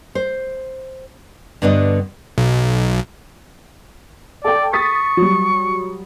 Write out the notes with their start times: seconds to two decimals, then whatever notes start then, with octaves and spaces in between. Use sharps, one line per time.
0.15 C5
1.62 G2 D3 B3 D4 D#5
2.38 B1
4.44 A4 D5 G5
4.73 C#6 D#6 A6 B6
5.17 F#3 G3